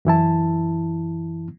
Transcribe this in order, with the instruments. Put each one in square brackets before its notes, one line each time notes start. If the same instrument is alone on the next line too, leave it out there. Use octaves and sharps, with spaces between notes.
[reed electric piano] F#2 E3 E4 A5